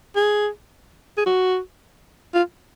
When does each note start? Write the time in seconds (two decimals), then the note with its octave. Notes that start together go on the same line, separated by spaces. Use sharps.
0.16 G#4
1.17 G#4
1.26 F#4
2.34 F4